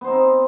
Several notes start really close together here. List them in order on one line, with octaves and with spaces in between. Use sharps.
B3 C5 D#4 C4